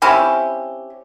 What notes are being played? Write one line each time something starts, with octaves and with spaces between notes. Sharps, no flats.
C4 C#4 E4 G4